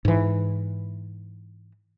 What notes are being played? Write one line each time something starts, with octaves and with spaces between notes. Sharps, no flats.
G#2 E3